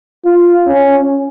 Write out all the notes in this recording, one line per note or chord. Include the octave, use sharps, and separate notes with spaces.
F4
C#4